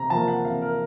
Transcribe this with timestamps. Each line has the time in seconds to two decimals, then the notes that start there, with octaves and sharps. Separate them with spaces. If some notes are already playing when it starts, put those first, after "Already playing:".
Already playing: C3 A#5
0.10 F3 A#3 A5
0.28 F#5
0.45 C3 F5
0.62 A#4